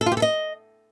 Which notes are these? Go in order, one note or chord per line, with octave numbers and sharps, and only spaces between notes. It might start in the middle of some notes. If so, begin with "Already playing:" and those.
A4
F4
G4
A4
D#5